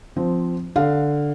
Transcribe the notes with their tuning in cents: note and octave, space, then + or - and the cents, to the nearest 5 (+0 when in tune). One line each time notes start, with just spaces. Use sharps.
F3 +0 C4 -10
D3 +0 F5 +0